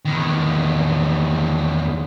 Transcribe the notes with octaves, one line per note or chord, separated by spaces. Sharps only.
E2 D#3